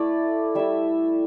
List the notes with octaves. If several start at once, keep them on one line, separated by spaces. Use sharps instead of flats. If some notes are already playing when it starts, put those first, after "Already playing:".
Already playing: A3 E4 D5
G3 E4 E5